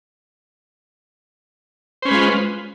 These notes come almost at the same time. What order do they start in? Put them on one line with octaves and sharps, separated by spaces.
C5 C#4 B4 G#3 F4